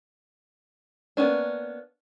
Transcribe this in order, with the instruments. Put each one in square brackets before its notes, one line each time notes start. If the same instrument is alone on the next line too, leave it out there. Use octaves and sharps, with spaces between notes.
[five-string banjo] A#3 B3 C#4 D4